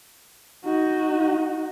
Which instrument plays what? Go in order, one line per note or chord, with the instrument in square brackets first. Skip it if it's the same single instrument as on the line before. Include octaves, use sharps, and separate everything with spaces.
[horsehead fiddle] D#4 F#4